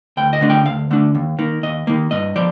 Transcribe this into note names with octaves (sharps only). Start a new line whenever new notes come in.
D2 G5
D#5
D3 A3 D4
G5
D2 F5
D3 A3 D4
D#2
D#3 A#3
D#2 D#5
D#3 A#3
G2 D#5
F3 D5